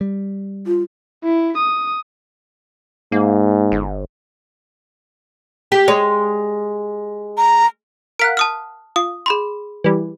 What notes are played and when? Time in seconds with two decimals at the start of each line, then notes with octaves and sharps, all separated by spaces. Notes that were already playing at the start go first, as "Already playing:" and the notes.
0.01 G3
0.67 F4
1.24 E4
1.57 D#6
3.12 G#2 A#3
3.72 G1
5.72 G4
5.88 G#3 C#5
7.37 A#5
8.19 A#4 F5 F#5 B6 D7
8.37 A5 D#6 F6
8.96 F4 D#6
9.26 G#4 B5 C6
9.84 E3 G3